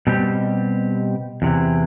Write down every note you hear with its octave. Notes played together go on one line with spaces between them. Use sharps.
B2 G3 C4 G4
E2 C3 E3